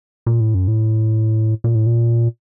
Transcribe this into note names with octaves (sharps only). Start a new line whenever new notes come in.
A#2
A2
F#2
A2
A#2
A2
A#2